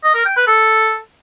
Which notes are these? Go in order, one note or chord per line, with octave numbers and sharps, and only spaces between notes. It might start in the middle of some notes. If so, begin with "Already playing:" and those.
D#5
A#4
G5
B4
A4